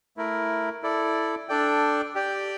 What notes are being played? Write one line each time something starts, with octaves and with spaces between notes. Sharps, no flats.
A3 E4 A#4
E4 A4 D5
D4 A4 D5 G5
G4 D5 G5